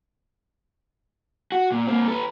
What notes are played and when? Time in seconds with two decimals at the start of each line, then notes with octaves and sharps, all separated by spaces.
1.52 F#4
1.72 A#2
1.87 A#3 C4
2.08 A4 B4